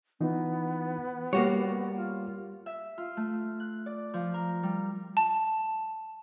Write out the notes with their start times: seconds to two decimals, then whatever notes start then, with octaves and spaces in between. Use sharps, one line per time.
0.21 E3 B3 D#4 F4
1.33 G3 A#3 F#4 G4 C#5
1.97 F4
2.66 E5
2.98 F4
3.17 A3
3.60 F#6
3.86 D5
4.14 F3
4.34 A#4
4.63 G3
5.17 A5